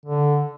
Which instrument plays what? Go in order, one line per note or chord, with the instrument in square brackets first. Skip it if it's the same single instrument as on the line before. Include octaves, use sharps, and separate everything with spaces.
[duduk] D3